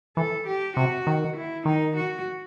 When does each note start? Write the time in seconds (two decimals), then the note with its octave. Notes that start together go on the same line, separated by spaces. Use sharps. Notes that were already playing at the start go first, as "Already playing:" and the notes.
0.17 E3 A4
0.47 G4
0.76 C3 F#4
1.07 D#3
1.36 E4
1.65 D#3 D#4
1.96 F#4